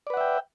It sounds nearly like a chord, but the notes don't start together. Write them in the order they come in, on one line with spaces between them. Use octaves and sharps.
D5 B4 F#5 E5 G5